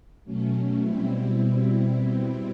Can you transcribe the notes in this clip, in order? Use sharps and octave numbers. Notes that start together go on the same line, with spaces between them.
B2 F#3 A3 C#4
B2 G3 C4 E4